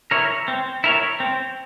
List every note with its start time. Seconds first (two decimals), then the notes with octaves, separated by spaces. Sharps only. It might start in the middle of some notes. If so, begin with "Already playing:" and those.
0.11 E4 A#4 C#5
0.48 C4
0.84 E4 A#4 C#5
1.20 C4